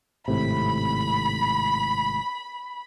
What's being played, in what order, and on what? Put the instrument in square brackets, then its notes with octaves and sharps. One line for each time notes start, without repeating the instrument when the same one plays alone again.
[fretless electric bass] G#1 A2 C3 [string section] B5